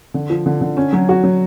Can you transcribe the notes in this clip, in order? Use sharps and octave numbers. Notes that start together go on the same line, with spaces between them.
D3
F3
D3
D3
C#4
F#3
F#4
F#3